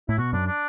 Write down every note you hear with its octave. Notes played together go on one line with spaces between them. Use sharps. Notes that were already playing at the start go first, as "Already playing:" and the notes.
A2 E4
B2 F#4
F#2 D4
D4